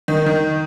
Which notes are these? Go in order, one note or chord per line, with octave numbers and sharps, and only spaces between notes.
D#3
D#3